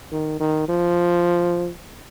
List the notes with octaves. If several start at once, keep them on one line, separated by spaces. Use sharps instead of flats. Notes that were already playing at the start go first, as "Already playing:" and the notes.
D#3
D#3
F3